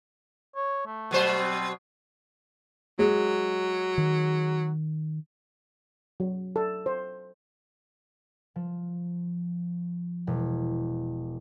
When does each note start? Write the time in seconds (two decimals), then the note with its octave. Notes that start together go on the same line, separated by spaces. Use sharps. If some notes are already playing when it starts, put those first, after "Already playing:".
0.56 C#5
0.86 A3
1.11 B2 F#3 C5
1.38 C4
2.99 F#3 G#3
3.98 D#3
6.20 F#3
6.56 A4
6.86 C5
8.56 F3
10.27 E1